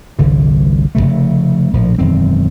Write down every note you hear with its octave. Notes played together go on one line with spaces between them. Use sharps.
G1 C2 D3 E3
F1 F2 C#3 A3
A#1 A2 F3
E1 F#2 D#3 C4